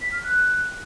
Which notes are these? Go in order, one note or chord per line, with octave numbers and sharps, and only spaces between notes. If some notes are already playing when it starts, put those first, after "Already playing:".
B6
F6
F#6